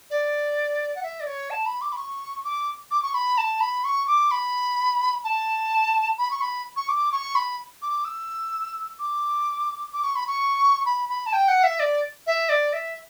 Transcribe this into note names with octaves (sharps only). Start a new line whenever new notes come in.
D5
F#5
E5
D5
C#5
A5
B5
D6
B5
C#6
D6
D6
C#6
B5
A5
B5
C#6
D6
B5
A5
B5
C#6
B5
C#6
D6
C#6
B5
D6
E6
D6
D6
C#6
B5
C#6
B5
B5
A5
G5
F#5
E5
D5
E5
D5
E5